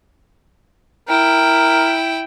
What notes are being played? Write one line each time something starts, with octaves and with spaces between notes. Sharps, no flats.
E4 A#4 G5